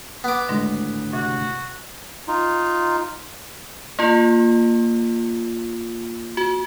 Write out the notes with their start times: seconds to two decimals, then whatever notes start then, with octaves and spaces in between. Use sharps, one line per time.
0.24 B3 D6
0.49 G#1 D2 A2 G#3
1.13 C3 F#4
2.28 D#4 F4
3.99 A#3 F4
6.37 F#4